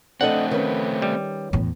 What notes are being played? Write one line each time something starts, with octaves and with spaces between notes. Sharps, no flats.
A3 C4 D4 A4 D#5 F#5
D#3 C#4 B4
G3
E2 A2